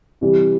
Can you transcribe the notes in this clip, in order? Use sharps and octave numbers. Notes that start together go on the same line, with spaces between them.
C3 E3 G3